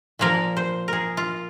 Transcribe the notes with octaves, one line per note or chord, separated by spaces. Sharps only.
A#2 F3 A#3 A#4
C5
G#4 A#4
F4